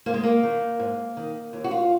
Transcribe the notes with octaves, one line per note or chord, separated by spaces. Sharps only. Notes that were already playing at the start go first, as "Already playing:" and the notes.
G#2 A#3
G#3
A#3
D#3
G#2
D#3
D#2
F#4
F4